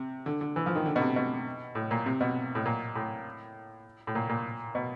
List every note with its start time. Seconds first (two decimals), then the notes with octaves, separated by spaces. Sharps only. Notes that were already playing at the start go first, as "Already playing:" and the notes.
Already playing: C3
0.26 D3
0.41 D3
0.56 E3
0.66 F3
0.76 D#3
0.86 D3
0.96 B2
1.01 C3
1.16 B2
1.75 A2
1.91 A#2
2.06 C3
2.21 B2
2.55 A2
2.65 A#2
2.95 A2
4.07 A2
4.15 A#2
4.29 A#2
4.75 B2